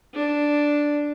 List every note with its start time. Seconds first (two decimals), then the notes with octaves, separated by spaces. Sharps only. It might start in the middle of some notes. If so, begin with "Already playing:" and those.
0.14 D4